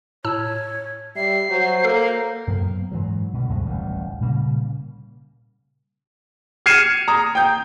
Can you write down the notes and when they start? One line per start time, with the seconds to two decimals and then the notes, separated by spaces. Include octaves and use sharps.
0.25 A2 C#5 A5 E6
1.16 G3 E5 C7
1.50 F#3 C5
1.84 A#3 A4
2.47 F#2 F#3 A#3 B3
2.91 G#2 E3 F#3
3.33 B2 D3 E3 G3
3.49 D2 G2 D3 G#3
3.66 D1 A1 D#2 G3
4.21 A#2 C#3 G3 A#3
6.66 F6 G#6 C7 C#7 D#7 E7
7.08 A#5 D#6
7.35 G5 G6